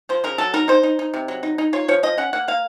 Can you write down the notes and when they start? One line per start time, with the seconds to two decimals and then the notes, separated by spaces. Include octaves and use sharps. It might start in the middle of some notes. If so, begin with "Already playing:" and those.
0.09 F3 C5
0.24 C#3 A#4
0.38 F#3 A4
0.54 D#4 A#4
0.68 D#4 C5
0.83 D#4
0.99 D#4
1.14 C3
1.28 F#3
1.43 D#4
1.58 D#4
1.73 F4 C#5
1.88 F3 C#5
2.03 F3 D#5
2.18 C#4 F#5
2.33 A#3 F#5
2.48 A#3 F5